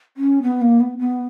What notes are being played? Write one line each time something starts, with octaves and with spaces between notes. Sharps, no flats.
C#4
B3
A#3
B3
B3